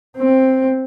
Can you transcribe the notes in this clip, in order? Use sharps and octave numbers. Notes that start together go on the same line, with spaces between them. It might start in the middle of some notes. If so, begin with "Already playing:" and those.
C4